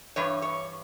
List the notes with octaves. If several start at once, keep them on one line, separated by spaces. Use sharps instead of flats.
G2 E3 C#5
C#5